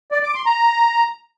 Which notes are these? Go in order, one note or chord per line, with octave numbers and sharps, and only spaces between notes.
D5
D6
C6
A#5